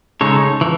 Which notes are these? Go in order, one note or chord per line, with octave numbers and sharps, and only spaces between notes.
C#3 G#3 D#4 A4 C#5
E3